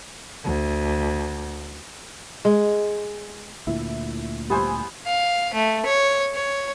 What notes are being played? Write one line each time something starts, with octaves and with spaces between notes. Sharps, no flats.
D2
G#3
D2 A#2 E4
G3 B3 E4 C5 G#5
F5
A3
C#5
C#5